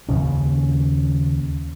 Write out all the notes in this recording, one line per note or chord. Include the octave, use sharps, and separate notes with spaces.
D#2 C#3 C#4